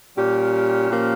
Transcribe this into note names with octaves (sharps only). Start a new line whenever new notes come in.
A#2 G3 C#4 G4
A#2 F3 A#3 C#4 G4